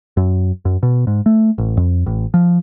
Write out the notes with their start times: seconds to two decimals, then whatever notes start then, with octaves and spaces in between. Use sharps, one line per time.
0.17 F#2
0.65 F#2
0.83 B2
1.07 G#2
1.26 A3
1.58 A1
1.77 F2
2.06 A1
2.34 F3